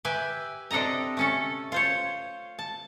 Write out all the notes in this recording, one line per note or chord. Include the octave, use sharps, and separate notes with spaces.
G4 B4 E5 G#5
C3 D4 A4 D#5 A#5
A3 C#4 A4
F4 C5 C#5
A5